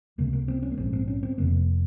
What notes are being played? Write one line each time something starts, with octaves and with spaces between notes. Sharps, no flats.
C#2 C3 A#3
A#3
C4
C#4
A#3
A#1 G#2 C4
C4
C#4
C4
F1 F2 C3 A#3